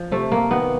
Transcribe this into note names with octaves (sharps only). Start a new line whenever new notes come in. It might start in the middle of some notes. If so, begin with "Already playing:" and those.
Already playing: F3
C3 A3
A#3
D#3 B3